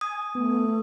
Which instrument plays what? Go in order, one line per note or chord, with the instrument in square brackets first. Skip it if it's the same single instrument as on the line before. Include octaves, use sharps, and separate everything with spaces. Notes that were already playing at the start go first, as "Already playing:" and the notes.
[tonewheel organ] G#5 [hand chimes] D#6
[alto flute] A3 [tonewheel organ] B3